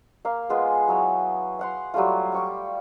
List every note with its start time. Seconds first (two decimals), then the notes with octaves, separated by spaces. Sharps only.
0.25 A#3 F5
0.49 G#3 B3 F4 G#4
0.88 F#3 E4 C#5 G#5
1.59 F5 F#5 C6
1.94 F#3 G3 A3 F4
2.32 G5 C#6 D6